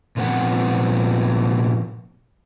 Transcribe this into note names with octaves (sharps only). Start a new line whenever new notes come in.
A#2 F3 B3 C4 F#5